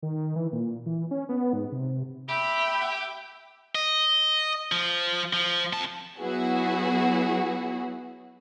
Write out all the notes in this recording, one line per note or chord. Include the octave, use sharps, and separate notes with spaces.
D#3
E3
A#2
E3
C#4
B3
G#2
C3
G4 E5 G5 B5
D#5
F3
F3
F2 A5
F#3 B3 E4 F#4 G#4